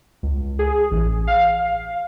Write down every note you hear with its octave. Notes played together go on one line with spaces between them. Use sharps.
C#2
G#4
A1
F5